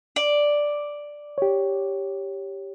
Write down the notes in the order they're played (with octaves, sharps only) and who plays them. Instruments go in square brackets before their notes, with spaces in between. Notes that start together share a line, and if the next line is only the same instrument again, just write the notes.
[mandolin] D5
[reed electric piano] G4 C#5